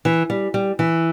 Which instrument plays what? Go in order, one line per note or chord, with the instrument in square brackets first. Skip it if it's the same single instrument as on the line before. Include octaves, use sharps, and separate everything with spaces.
[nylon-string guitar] E3
G3
G3
E3